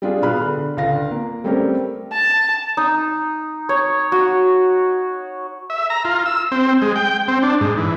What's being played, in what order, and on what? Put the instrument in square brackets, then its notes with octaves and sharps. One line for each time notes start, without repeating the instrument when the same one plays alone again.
[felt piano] G3 D4 F4 G#4
B2 F4 G#4 B5 F6 F#6
D3
C#2 D3 F5 A#6
A#3
G3 A3 C4 C#4 G4 A#4
[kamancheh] A5
[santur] D#4
C#5
F#4
[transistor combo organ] E5
A#5
F4
E6
C4
G#3
G5
C4
D4
G#2
E3